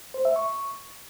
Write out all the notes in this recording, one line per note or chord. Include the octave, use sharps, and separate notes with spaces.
C5
E5
C#6